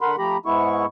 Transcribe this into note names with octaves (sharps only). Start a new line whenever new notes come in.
D3 A#4 F#5 B5 C6
F3 A3 G4 A#5 B5
G#2 G#3 B3 E4 C#6